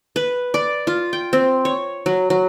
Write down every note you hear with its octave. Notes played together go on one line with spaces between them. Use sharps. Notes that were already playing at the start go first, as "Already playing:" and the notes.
B4
D5
F4
G5
C4
C#5
F#3
F#3